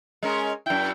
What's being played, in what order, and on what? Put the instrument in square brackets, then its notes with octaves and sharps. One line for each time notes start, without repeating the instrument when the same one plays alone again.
[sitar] G#3 C#4 A#4
[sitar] F#2 E4 [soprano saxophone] G5